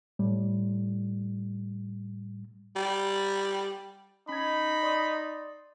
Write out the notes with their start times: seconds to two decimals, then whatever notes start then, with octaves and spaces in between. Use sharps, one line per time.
0.19 A2 G3
2.76 G3
4.29 C#4 D#4 B5 G#6
4.83 D5 C6 D#6